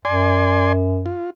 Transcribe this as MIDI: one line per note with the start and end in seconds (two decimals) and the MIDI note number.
0.05 1.16 42
0.05 0.73 74
0.05 0.73 80
0.05 0.73 84
1.06 1.30 65